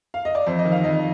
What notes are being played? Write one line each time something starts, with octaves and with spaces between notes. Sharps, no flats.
F5
D#5
D5
F2 C5
D#5
D#3
F5
F2 D#5